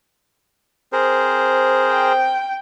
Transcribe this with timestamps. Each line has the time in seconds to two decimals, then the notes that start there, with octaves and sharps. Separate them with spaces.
0.93 C4 G#4 A#4 C5
1.90 G5